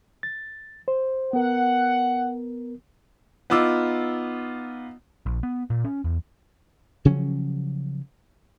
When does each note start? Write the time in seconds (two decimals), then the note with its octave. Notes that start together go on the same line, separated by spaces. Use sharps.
0.23 A6
0.88 C5
1.33 B3 A#4 F#5
3.50 B3 D#4 F4 D6 E6
5.26 A#1
5.43 B3
5.70 A#2
5.85 C#4
6.04 E2
7.05 C#3 F3 F#3 C#4